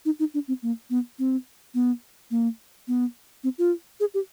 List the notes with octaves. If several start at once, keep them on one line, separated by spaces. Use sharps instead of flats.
D#4
D#4
D4
C4
A#3
B3
C4
B3
A#3
B3
C4
F4
G#4
G4